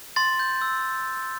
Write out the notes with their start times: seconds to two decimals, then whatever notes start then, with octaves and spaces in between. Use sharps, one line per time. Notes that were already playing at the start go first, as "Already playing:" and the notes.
0.16 C6 A6
0.39 G6
0.62 E6